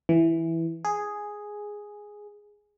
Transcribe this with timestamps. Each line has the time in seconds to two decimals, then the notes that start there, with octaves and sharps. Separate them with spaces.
0.09 E3
0.85 G#4